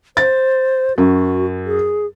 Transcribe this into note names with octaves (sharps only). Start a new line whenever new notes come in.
C5 A6
F#2 F#4
G#4